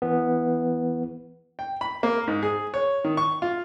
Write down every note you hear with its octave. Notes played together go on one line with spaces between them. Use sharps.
E3 B3
G5
B5
A#3
G#2
G#4
C#5
D#3
C#6
F4